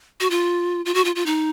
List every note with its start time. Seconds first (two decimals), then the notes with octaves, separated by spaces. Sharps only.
0.20 F#4
0.30 F4
0.85 F4
0.94 F#4
1.05 F4
1.16 F4
1.26 D#4